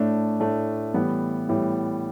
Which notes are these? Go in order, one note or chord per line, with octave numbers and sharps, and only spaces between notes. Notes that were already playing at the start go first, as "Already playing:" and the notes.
Already playing: A2 A3 D4
A2 A3 D4
A2 E3 G3 B3
A2 E3 G3 B3